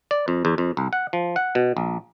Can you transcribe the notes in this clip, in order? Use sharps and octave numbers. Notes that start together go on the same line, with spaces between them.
D5
F2
E2
F2
C2
F#5
F3
F#5
B2
A#1